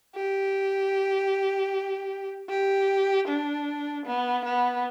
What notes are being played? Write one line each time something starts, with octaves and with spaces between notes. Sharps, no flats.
G4
G4
D4
B3
B3